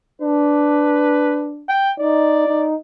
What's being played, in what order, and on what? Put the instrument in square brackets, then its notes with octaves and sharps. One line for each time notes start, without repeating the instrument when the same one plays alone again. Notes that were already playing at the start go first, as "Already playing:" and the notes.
[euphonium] D4 [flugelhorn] B4
[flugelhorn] G5
[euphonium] D#4 [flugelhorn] D5
[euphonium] D#4